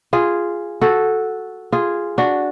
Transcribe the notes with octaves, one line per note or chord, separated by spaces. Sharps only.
F4 G#4
F#4 A4
F4 G#4
D4 F#4